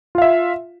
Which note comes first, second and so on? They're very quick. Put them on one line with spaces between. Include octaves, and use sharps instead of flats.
F4 F5 E5